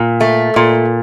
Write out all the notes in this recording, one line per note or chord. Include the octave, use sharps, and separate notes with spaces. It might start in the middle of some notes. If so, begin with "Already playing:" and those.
Already playing: A#2
A3
A#2